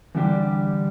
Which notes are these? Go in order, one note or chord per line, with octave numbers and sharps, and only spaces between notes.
E2 D3 G3 D4 G4